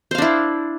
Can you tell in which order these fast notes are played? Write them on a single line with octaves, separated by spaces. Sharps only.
C5 F5 D4 E4